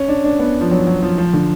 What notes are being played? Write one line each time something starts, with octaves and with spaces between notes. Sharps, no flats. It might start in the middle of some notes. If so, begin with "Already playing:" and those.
Already playing: C#4
D4
D4
B3
F3
F#3
F#3
F3
F3
D3